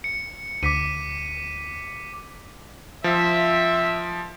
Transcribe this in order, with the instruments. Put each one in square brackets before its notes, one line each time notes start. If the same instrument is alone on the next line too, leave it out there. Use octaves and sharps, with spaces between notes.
[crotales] C#7
[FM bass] D2 [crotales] D6 B6 D#7
[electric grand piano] F3 [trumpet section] C4 E5